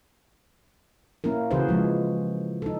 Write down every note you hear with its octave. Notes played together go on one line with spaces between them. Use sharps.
A#3 C#4 E4 A#4
C#3 E3 F#4 G#4 B4 C5
F3 G#3
D#4 A4